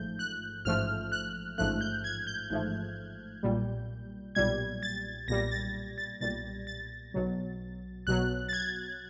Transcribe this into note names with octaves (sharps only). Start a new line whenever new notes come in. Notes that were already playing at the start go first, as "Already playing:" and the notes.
Already playing: A1 G#2 F3 A3 G6
F#6
A1 G#2 F3 A3 F6
F#6
A1 G#2 F3 A3 F#6
G6
G#6
G6
A1 G#2 F3 A3
B1 A#2 G3
B1 A#2 G3 G#6
A6
B1 A#2 G3 A#6
A6
A6
B1 A#2 G3 A6
A6
B1 B2 F#3
B1 B2 F#3 F#6
A6
G#6